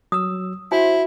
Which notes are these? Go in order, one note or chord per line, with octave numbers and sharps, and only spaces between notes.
F#3 D#6 E6
E4 F#4 C5 G#5